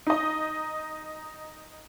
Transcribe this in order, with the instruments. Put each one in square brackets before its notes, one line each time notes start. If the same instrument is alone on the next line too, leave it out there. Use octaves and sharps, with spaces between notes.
[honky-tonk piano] D#4 D#5